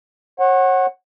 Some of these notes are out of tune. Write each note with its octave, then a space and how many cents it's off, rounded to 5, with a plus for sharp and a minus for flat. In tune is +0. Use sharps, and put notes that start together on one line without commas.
C#5 -40 F#5 +0